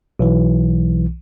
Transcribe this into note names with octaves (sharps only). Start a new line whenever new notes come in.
B1 E3